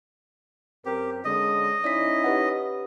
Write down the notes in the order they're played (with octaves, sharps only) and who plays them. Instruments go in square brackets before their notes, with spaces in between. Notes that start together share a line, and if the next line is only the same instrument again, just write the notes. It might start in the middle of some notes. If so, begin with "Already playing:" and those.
[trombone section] F#2 C4 A#4 [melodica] G4
[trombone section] D3 G#3 C#4 [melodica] D#5
[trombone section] C#4 D#4 E4 [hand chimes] D5 B6
[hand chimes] G4 B4 F#5